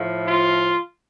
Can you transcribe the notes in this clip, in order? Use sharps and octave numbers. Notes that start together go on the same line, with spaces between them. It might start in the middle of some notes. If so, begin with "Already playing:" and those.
Already playing: A2 F3 A3
F4